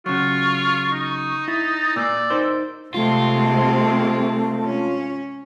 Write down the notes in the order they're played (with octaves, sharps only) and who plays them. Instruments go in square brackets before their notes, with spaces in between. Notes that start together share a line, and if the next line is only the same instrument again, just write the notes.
[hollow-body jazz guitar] C#3 F#3 [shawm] F4 [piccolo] C#6
[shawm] D#4
[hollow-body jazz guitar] E4 [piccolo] A6
[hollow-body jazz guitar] A#2 A#3 [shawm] D5 [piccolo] E6
[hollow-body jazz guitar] D#4 A#4 C5
[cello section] C3 G#3 [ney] A3 [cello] C4 [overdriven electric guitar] F4
[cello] C#4